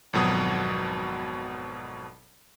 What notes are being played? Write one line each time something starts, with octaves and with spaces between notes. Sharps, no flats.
G#1 F2 B2 F#3 D#6